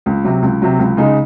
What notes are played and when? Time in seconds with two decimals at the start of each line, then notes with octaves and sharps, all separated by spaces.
0.06 C#2
0.24 C3 F#3
0.42 C#2
0.62 C3 F#3
0.79 C#2
0.97 C#3 G#3 D#4